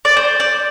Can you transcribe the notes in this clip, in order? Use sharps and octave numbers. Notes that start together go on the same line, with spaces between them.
D5
C5
D5